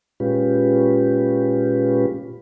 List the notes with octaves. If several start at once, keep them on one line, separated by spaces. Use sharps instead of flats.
A#2 G#3 C#4 F4 G4 B4